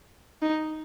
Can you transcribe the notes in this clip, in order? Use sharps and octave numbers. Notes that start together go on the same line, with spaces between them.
D#4